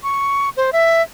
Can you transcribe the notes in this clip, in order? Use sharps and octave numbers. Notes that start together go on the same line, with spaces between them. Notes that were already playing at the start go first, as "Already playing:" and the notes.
C#6
C5
E5